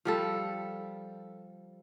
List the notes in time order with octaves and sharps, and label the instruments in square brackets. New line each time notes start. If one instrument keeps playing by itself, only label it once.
[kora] F3 G3 A4